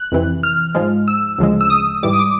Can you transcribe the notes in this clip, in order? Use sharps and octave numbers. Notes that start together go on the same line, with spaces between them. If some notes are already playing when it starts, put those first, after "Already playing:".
Already playing: F#6
F2 C3 E3
F6
G#2 F3 G#3
E6
D2 C#3 F3 G#3
E6
D#6
G#2 E3 G3 D6
D#6
D6